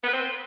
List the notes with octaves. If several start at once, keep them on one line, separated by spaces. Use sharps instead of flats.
B3
B4
C4